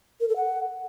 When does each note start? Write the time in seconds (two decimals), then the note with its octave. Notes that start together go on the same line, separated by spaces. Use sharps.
0.20 A#4
0.28 A4
0.36 F#5